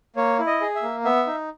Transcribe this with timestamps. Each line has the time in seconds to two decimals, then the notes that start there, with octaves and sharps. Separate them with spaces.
0.16 A#3 C#5
0.39 E4
0.47 D#5
0.61 G#4
0.75 E5
0.82 A#3
1.05 B3 E5
1.27 D#4